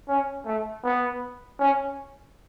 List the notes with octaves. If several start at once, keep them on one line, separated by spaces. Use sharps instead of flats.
C#4
A3
B3
C#4